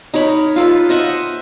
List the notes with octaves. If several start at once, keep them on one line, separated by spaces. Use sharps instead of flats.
D#4 A#4 C#5 B5
F4 A4 B4
C5 D#5 E5 F#5